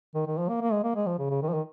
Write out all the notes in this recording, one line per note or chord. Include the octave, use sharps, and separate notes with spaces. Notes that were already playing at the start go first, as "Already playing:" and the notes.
D#3
D#3
F3
A#3
A#3
G#3
A#3
G#3
F3
C#3
C#3
D#3
F3
D#3